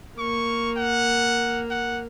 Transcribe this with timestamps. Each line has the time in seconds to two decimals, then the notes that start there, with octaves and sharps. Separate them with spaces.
0.18 A#3 A#4 C#6
0.77 F#5
1.71 F#5